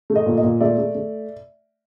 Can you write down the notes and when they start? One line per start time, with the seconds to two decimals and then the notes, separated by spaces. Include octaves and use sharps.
0.10 A3
0.16 D#5
0.26 A#2
0.37 D#5
0.43 A#2
0.60 A3 D5 E5
0.78 A3
0.95 A3